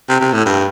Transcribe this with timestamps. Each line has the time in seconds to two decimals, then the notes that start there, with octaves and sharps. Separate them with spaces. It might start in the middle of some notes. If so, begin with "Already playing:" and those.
0.09 C3
0.21 C3
0.33 A2
0.46 G2